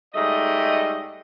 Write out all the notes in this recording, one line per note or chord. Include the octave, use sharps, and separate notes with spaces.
G#2 G3 A3 D#5